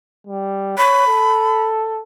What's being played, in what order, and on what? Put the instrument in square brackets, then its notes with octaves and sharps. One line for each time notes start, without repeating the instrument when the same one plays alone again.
[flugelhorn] G3
[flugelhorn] C#5 [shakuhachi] B5
[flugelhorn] A4